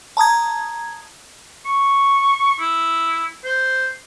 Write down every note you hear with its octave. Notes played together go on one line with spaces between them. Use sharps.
A5 A#5 D#6 G#6
C#6
E4
C5